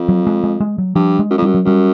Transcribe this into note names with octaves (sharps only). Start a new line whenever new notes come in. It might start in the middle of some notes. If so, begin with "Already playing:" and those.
Already playing: F2
F#3
G#3
G#3
G#3
F#3
G2 F3
G#3
F#2
F2
F#2 G3
F#3
F#2 G3